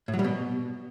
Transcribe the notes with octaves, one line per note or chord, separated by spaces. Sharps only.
A2
F#3
G3
B2